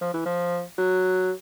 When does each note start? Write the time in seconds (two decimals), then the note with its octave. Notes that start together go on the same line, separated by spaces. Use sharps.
0.02 F3
0.14 E3
0.26 F3
0.78 F#3